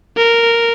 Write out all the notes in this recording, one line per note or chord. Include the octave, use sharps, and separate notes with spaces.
A#4